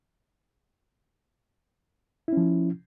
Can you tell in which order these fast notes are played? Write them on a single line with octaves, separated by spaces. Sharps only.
E4 C#4 F3